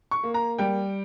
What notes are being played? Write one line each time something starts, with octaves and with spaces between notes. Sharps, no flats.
C#6
A#3
A#5
G3 G5